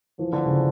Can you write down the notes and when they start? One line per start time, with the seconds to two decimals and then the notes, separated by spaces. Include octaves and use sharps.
0.19 E3 F3
0.33 D3
0.46 C#3